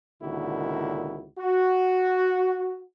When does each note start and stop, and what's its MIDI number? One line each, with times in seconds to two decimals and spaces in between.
0.22 1.26 37
0.22 1.26 46
0.22 1.26 50
0.22 1.26 51
0.22 1.26 64
0.22 1.26 66
1.39 2.82 66